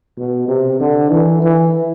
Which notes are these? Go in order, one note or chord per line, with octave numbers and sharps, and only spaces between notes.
B2
C3
D3
E3
E3